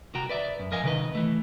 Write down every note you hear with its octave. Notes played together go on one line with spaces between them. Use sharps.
C2 F#4 G5 A#5
B4 D5 E5
F#2
F2 A#4 D#5 F5 G#5
C3 D#3 A#4 B4 D#5
E3 A3